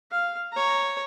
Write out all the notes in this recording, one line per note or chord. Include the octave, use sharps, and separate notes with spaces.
F5
C#5 A#5